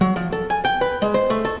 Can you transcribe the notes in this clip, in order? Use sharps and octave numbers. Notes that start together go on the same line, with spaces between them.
F#3
F3
A4
G#5
G5
B4
G#3
C5
A3
A4